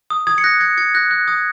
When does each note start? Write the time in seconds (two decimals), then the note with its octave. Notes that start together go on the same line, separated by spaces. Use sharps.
0.10 D#6
0.27 D#6 G#6
0.38 C#7
0.44 F#6 A#6
0.60 G#6 C#7
0.77 G#6 C#7
0.94 F#6 A#6
1.11 F#6
1.28 D#6 G#6